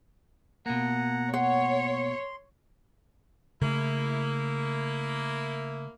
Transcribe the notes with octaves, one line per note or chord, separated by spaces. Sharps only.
B2 A#3 F#5 A#5
C#5 F#5 C6
C#3 A3 A#3 E4